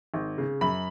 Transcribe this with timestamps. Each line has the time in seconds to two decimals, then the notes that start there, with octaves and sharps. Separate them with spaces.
0.14 G#1
0.38 C#3
0.61 F#2 B5